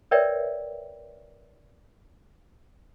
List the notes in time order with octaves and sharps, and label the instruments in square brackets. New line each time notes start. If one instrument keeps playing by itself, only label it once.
[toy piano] A#4 B4 C#5 D5 E5 G5